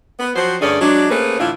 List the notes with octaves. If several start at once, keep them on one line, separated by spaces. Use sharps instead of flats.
B3
F3 F#3 C4 F#4 C5
G2 D3 A3 C#4 G#4 D5
F#3 G#3 D4
A3 A#3 C4 C#4 G#4 B4
A2 D3 E3 E4 F4